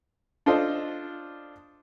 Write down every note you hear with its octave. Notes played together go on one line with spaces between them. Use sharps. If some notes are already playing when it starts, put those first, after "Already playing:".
D4 F4 A4 C5 D#5